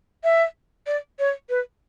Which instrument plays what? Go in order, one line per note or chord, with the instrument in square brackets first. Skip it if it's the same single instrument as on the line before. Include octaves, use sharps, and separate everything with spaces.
[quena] E5
D5
C#5
B4